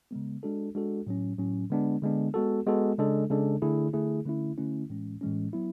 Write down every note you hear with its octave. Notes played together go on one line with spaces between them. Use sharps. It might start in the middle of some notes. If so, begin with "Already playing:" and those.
C#3 G#3 B3
G#3 D4 F#4 A4
G#3 D4 F#4 A4
A2 F#3 C#4
A2 F#3 C#4
D3 G#3 B3 D4
D3 G#3 B3 D4
G#3 B3 F#4 A4
G#3 B3 F#4 A4
C#3 G#3 D4 A4
C#3 G#3 D4 A4
D3 A3 E4 G#4
D3 A3 E4 G#4
D3 A3 C#4 E4
D3 A3 C#4 E4
A2 E3 G#3 C#4
A2 E3 G#3 C#4
F#3 B3 E4